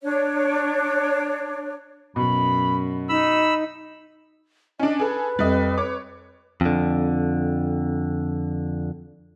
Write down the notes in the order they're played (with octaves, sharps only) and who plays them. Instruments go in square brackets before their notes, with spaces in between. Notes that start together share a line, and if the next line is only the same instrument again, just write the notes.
[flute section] D4 C#5
[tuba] F#2 [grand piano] B2 [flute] B5
[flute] D#4 [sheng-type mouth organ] B5 E6
[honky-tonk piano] C#4 D4 [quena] D#5
[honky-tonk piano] G#4 A4 [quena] B4
[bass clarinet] F2 [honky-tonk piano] G3 D#5
[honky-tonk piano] C#5 D6
[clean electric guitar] F2 D3